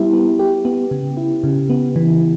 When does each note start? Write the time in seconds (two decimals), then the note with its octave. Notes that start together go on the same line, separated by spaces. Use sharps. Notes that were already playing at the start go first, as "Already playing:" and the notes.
Already playing: G3 B3 E4 G4
0.13 B3
0.39 G4
0.65 B3
0.91 C#3
1.17 E4
1.44 C#3
1.69 B3
1.96 E3